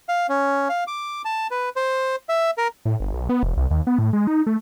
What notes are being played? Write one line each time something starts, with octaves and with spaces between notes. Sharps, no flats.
F5
C#4
F5
D6
A5
B4
C5
E5
A#4
A2
G1
B1
B3
E1
C2
D#2
B3
A2
G#3
D#4
A3